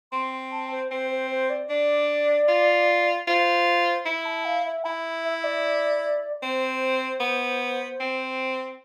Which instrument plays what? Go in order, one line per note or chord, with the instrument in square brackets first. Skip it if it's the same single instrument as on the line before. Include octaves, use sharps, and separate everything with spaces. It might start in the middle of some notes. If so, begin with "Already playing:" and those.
[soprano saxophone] C4 [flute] C6
[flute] A5
C5
[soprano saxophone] C4 [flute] C5
[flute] C5
C5
D5
[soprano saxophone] D4 [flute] D5
[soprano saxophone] F4
[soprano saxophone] F4 [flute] C5
[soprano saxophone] E4 [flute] B5
[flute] A5
F5
E5
[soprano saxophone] E4 [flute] B5
[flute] E5
D5
[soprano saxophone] C4 [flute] C5
[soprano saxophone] B3
C4